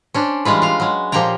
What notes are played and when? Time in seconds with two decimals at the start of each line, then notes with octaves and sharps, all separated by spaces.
0.14 C#4 D4 C5
0.45 E3 G3 G#3 F4 B4
0.62 F4 F5
0.80 F#3 G#3
1.12 A#2 F3 G4 G5 A#5